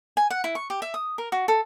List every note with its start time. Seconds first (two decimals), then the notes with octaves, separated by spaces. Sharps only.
0.17 G#5
0.31 F#5
0.44 E4
0.55 C#6
0.70 G4
0.82 E5
0.94 D#6
1.18 A#4
1.32 F#4
1.48 A4